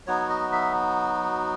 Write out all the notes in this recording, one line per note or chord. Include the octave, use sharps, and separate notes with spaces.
F#3 B3 D#4 F#4 C#5
D#5
E5